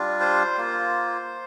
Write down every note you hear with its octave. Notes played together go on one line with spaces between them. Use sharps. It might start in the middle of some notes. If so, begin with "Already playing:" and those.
Already playing: G3 D4 F4
C5
A#3 F4